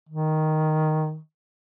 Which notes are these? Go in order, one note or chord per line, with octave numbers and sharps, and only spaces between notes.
D#3